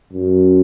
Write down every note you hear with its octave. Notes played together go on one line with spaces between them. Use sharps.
F#2